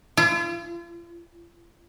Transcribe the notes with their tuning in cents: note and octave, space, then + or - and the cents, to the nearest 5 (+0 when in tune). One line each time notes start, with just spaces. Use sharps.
F4 -40